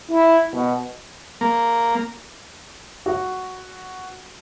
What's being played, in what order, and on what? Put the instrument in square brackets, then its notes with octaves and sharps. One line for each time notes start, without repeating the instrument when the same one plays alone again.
[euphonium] E4
B2
[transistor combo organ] A#3
[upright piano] F#4